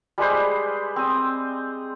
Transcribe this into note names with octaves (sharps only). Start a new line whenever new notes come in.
G3 G#3 B4 C5
C4 D#6